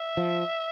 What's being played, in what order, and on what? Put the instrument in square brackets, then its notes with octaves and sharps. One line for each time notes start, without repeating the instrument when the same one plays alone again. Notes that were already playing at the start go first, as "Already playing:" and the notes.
Already playing: [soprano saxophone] E5
[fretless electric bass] F3